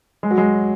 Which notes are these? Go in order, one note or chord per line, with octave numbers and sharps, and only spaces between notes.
G#3
F#3
G#3